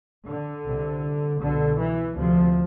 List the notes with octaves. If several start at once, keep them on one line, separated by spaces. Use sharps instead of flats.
D3
C2 C3
C2 B2 D3
E3
D2 C3 F3